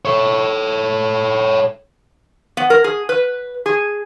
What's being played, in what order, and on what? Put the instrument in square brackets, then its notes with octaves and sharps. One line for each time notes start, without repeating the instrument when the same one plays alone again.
[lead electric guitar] A4 C#5
[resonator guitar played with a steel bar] B3
A#4
G#4
B4
G#4